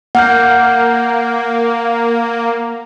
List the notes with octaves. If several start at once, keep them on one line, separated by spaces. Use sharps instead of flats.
A#3 F#5 F6 G6